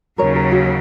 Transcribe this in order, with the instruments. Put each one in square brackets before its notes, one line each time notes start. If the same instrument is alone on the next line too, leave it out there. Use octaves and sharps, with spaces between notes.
[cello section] D#2 C#3 F#3 [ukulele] A#4 C#5
[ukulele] A#4
F#4